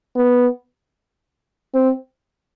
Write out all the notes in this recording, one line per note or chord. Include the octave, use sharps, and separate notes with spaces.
B3
C4